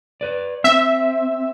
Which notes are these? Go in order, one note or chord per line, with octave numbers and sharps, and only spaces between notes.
B4 D5
C4 E5